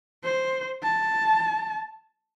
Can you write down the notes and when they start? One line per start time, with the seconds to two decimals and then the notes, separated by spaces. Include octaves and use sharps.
0.24 C5
0.83 A5